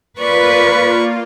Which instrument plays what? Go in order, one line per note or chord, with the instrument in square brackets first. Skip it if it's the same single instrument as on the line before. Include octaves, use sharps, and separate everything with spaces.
[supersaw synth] A#3 F4 [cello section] B4 [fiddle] D5 C#6